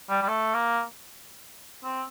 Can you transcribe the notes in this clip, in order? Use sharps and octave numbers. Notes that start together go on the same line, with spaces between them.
G3
G3
A3
A#3
C4